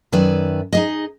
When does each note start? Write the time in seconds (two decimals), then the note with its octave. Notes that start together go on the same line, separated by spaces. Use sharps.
0.12 F#2 D#3 B4 D5 E5 G#5
0.73 D#4 G#4 D#5